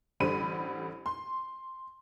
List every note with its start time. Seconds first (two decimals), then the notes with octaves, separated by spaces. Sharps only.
0.20 A1 D3 G3 C5 B5 D#7
1.06 C6